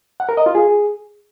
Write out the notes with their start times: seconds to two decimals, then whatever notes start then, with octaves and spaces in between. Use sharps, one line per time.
0.20 F#5
0.29 A#4
0.37 D#5
0.46 F4
0.55 G#4